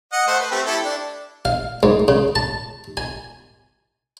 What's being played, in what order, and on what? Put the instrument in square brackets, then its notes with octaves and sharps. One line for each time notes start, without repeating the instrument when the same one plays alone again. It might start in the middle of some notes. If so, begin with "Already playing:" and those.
[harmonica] D#5 F#5
A3 C5 F#5
B4
A3 C4 G4
E4 G4 A4
D4
[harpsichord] F5
G#2
C#3
A5
G#5